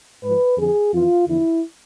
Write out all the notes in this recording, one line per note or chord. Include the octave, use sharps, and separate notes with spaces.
G#2 F3 B4
F2 D3 F3 G#4
F2 E3 F4
E2 D3 F3 E4